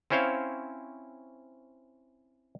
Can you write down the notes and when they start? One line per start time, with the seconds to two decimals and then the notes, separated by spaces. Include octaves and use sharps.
0.10 C4 C#4 E4 C5 C#5 F5